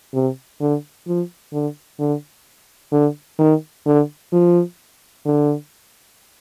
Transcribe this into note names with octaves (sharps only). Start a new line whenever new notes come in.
C3
D3
F3
D3
D3
D3
D#3
D3
F3
D3